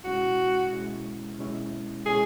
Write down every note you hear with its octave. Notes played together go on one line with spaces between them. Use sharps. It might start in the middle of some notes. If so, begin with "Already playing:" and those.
B2 G#3 C#4 E4 F#4
B2 G#3 C#4 E4
B2 G#3 C#4 E4
B2 G#3 C#4 E4 G#4